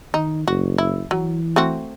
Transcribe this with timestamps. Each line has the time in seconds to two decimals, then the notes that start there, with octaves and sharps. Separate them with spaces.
0.14 D#3 D#4
0.48 F#1 F#4
0.78 E4
1.11 E3 F#3
1.56 A3 C4 F#4